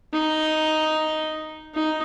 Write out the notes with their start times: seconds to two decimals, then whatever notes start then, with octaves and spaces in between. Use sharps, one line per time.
0.13 D#4
1.74 D#4